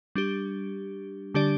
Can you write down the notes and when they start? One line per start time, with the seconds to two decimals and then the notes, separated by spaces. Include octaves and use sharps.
0.15 G3 D4 G4
1.34 D3 G3 D4 G4 D5